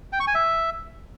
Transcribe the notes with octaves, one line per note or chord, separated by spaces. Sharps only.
G5
C#6
G#5
E5